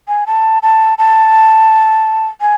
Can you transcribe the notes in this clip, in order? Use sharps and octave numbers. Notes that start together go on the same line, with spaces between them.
G#5
A5
A5
A5
G#5